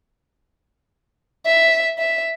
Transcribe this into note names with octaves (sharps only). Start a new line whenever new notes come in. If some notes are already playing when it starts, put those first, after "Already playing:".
E5
E5